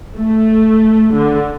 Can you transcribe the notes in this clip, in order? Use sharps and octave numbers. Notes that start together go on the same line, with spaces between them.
A3
D3